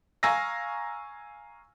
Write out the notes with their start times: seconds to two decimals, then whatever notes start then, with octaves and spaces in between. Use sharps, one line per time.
0.23 F5 G#5 A#5 C#6 E6 A#6